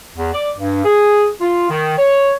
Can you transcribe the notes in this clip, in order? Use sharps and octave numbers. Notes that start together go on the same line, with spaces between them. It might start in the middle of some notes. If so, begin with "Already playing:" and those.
E2
D5
G2
G#4
F4
D#3
C#5